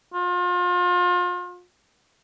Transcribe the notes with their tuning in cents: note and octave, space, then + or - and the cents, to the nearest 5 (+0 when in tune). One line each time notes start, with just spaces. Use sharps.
F4 +35